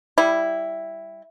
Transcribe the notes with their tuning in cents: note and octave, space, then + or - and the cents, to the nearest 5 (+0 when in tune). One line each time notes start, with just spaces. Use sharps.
G3 +0 E4 +0